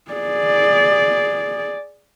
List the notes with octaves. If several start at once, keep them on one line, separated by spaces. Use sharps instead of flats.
G#4 D5